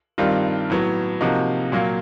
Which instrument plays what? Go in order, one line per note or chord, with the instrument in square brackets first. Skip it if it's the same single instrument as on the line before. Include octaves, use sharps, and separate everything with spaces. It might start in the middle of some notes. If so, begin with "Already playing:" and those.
[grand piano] G2 D#3 G3 C4 F4
A2 F#3 B3
C3 F3 A#3 D#4 F#4
A#2 F#3 A#3